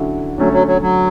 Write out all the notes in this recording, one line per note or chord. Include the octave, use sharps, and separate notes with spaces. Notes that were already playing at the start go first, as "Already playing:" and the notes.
Already playing: D3 F#3 C#4 E4
D3 F#3 A3 C#4
F#3
F#3
F#3